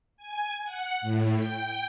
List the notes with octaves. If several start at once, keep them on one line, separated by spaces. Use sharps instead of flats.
G#5
F#5
A2
G5